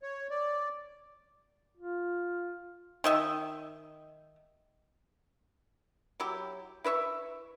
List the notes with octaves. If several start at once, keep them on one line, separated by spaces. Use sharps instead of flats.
C#5
D5
F4
D#3 D#5 E5
F#3 E4 G4
E4 B4 E5 C#6